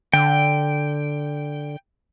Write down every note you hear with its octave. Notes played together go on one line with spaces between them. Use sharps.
D3 G5